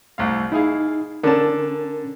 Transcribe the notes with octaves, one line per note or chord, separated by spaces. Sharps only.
C2 A2 F5
D#4 E4 G#4 F5
D3 C#4 A#4 A5